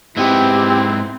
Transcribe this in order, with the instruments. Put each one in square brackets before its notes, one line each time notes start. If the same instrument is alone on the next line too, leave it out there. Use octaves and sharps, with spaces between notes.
[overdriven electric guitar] G#2 B3 [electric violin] C4 [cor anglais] E4 [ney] G4